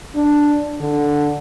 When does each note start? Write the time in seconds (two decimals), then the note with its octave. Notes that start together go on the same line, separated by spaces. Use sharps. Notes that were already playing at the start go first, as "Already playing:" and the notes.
0.16 D4
0.80 D3